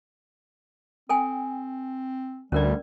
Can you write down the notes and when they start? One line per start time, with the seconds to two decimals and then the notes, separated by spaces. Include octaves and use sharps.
1.09 C4 A4 G5 G#5
2.52 D2 G3 C#4 A#4 D5